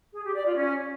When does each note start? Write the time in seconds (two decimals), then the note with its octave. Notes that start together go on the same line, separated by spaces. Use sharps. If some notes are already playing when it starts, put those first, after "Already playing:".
0.14 G#4
0.24 G4
0.35 D5
0.45 F4
0.55 C#4